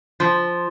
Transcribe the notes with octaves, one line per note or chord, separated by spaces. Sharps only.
F3